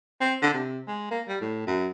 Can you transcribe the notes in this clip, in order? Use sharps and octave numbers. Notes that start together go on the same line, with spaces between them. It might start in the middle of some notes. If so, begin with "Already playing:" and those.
C4
D3
C3
G#3
A#3
G3
A2
F#2